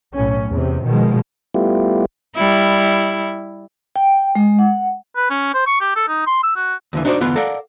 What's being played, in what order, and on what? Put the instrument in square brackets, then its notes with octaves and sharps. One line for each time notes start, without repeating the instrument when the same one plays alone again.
[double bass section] B1 A2 C#4
E2 C3
B2 D#3 F3 G#3
[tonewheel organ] G3 A3 B3 E4 F4 G4
[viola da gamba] G3 E4
[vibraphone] G5
G#3
F#5
[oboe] B4
C#4
C5
C#6
G4
A4
D#4
C6
E6
F#4
[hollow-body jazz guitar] D#2 D3 E3
D4 D#4 F#4 A#4 C5 D5
E2 D3 B3 F4 F#5
A4 A#4 D5 F5 F#5